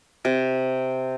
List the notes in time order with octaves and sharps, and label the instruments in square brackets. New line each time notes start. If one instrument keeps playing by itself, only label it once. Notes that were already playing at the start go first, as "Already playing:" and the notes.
[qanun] C3